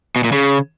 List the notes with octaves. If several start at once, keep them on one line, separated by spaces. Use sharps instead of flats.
B2
A#2
C#3